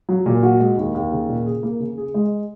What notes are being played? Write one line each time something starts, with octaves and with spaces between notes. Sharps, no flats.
F#3
A#2
F#4
G#3
D#2
D#2
C#3
A#2
G#4
A#3
C#3
G#4
G#3